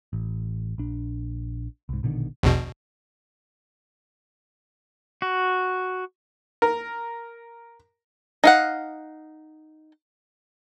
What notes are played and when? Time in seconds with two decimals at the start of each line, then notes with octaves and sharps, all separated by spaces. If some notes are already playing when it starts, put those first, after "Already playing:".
0.13 A1
0.78 A#1 D4
1.89 C2 G#2
2.03 A#1 B2 D3 D#3
2.43 A#1 E2 B2
5.22 F#4
6.62 A#4
8.44 D#4 F5 F#5